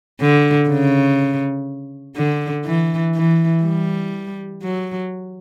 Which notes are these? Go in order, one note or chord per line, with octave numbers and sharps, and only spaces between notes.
D3
C#3
D3
E3
E3
G3
F#3